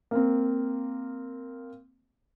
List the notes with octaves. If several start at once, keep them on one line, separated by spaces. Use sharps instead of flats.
A#3 C4